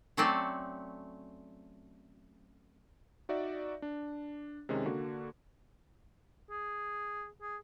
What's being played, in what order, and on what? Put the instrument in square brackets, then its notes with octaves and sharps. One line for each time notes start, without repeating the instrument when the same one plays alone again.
[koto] F#3 A3 C4 C#4 A4 D5
[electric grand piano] D#4 F#4 D5 E5
D4
C3 D#3 G#3 C#4
D3 A#3 F#4
[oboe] G#4
G#4